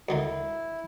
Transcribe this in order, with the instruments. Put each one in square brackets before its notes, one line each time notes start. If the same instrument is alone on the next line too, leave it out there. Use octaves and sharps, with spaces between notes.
[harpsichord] D2 D3 D#3 [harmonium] E4